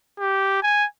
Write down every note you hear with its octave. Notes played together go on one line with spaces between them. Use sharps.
G4
G#5